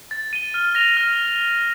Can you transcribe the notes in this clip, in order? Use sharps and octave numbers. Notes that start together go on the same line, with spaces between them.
A6
D#7 G7
F6
A#6 F7
F6